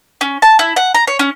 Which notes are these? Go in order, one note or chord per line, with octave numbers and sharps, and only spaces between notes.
C#4
A5
E4
F#5
A#5
C#5
C#4